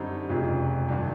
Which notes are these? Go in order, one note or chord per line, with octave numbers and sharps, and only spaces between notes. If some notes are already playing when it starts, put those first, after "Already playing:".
Already playing: F#2 D3 G3 C4 D#4
F1 F2 C#3
G2 D#3 F#3